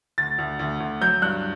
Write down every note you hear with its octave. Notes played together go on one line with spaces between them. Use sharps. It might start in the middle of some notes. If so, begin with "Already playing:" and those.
D2 A6
D2
D2
D2
F#3 G6
G2 F#6